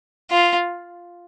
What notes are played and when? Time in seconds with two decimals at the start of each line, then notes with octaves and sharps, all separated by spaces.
0.31 F4